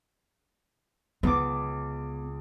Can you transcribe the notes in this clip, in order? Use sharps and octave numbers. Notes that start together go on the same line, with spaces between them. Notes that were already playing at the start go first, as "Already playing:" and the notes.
C#2 B3 D6